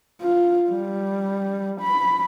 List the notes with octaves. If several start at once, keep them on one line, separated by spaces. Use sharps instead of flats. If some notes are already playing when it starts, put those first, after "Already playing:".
F4
G3
B5